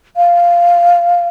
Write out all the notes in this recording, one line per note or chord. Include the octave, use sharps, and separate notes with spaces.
F5